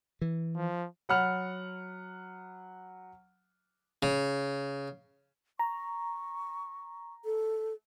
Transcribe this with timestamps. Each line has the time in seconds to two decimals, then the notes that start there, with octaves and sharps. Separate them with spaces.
0.22 E3
0.56 F3
1.09 F#3 F#5 B5 F6 C#7 F7
4.03 C#3
5.59 A#5 C#6
7.25 A4